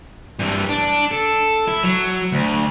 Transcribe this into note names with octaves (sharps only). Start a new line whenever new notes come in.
G2 E3
D4
A4
E4
F#3
D2